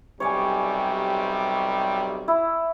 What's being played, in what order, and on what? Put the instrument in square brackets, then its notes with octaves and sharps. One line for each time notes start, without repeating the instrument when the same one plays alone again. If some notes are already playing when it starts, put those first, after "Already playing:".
[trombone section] B1 C3 G3 [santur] C#5 D5 G#5
[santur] E4